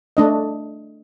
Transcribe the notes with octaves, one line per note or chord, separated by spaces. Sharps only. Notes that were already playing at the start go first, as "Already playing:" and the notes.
A3 D4 D#5